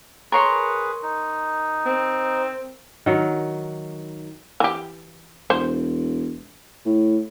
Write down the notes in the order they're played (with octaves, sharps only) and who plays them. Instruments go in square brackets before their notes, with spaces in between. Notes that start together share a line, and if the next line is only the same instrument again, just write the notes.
[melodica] G#4 B4 [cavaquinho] A#4 C#5 C6
[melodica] D#4
[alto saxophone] C4
[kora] D#3 F#3
[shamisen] E3 G4
[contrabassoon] E1 [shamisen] C5
[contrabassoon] A2